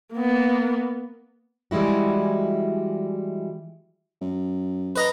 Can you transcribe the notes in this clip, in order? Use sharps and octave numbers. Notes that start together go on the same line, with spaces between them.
A#3 B3
E3 G3 G#3 E4 F#4
F#2
B4 D#5 A#5